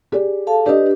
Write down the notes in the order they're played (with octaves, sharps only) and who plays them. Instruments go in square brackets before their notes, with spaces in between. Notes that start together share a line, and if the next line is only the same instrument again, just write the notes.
[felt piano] G4 G#4 D5
[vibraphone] A4 F5 A5
[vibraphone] D4 G4 B4 [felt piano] D5 D#5